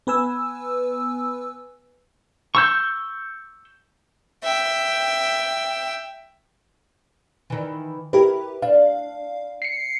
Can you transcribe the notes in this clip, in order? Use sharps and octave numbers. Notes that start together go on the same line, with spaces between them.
B3 B4 G#5 E6
C#6 E6 G6
E5 G5
D#3 E3
E4 G4 A#4 B4
D4 F5
C7 C#7